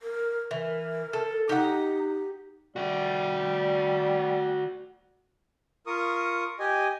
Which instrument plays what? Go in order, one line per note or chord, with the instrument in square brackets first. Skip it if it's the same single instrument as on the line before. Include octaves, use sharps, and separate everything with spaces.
[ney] A#4
[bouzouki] E3 [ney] A#4
[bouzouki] A4
[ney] D#4 [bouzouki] G4 F#5
[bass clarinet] G3 [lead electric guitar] F#4 D5
[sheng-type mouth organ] F4 A#4 C#6 D#6
G4 D#5 G#5